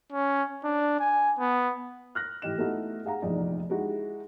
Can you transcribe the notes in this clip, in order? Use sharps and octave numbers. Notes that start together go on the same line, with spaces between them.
C#4
D4
G#5
B3
F6 F#6 A#6
A2 E3 G4 D#5 E7
A3 B3 D#4 E4 F#4 A4
G#4 F5 F#5 A#5
F1 A#1 E2 D#4 D5
G#3 D#4 E4 F#4 G4